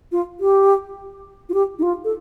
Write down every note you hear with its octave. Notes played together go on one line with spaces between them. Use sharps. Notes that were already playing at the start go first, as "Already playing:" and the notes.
F4
G4
F4
G4
D#4
F4
A4